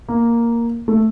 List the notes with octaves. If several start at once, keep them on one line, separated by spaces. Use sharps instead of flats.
A#3
A3